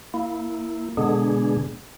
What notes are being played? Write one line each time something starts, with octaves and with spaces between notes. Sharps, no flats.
A#3 E4
B2 D3 G#3 B3 D4 G#4